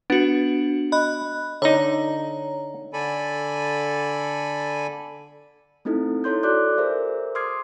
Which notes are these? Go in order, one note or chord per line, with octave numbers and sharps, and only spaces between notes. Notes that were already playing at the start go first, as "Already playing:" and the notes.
B3 D4 F#4
D#5 B5 F#6
D3 D#4 C#5 A#5
D3 A4 D5 G#5 B5
A3 C4 D#4 E4 A4
E4 A4 C#5 C6 G6
F#4 A4 D5 D6 F#6 G6
G#4 A#4 C5 E5
C6 D6 D#6 F6 G#6 C7